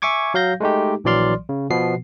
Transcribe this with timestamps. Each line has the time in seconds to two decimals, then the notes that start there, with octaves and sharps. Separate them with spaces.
0.02 E5 G#5 C#6 D6 G#6
0.34 F#3 F5 G6 A#6
0.60 G#3 A3 D#4 G4
1.04 A#1 E3 F#3 D5 C6 F6
1.49 C#3
1.70 B2 F3 B3 C7